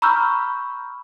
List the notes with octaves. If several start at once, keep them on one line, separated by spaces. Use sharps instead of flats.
A#5 B5 C#6 E6 F6 G6